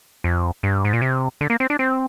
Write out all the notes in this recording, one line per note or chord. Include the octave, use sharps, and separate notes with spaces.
F2
G2
G#2
A#2
C3
D3
A#3
C4
D4
C4